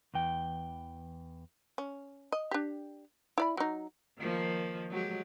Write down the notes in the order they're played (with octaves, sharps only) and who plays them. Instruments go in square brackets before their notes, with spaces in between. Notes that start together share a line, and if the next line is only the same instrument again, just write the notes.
[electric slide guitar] E2 E3 G5
[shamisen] C#4
D#5
D4 G4
E4 D5 B5
F#3 D#4
[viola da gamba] D#3 F3 A#3
F#3 G#3 G4